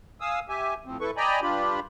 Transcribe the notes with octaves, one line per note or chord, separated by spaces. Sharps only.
F5 G#5 D#6 E6
G4 E5 G#5
A2 F3 C4
A2 E4 A4 B4 C#6
D5 D#5 G5 G#5 A#5 B5
G2 D4 F4 G4 B5